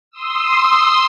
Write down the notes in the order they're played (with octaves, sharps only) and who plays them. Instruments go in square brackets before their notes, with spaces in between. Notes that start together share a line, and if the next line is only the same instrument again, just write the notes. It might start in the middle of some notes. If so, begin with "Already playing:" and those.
[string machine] C6 D#6 E6